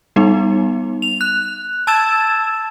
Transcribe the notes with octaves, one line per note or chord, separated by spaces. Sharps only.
G3 B3 D#4
F7
F#6
A5 E6 G#6 A6 E7